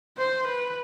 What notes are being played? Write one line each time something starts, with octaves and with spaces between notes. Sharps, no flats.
C5
B4